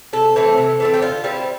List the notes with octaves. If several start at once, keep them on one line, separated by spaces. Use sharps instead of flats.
C3 A4
E3 A3 C4
C3
E3 A3 C4
G4
D3 F4
G3 C4 E4 A4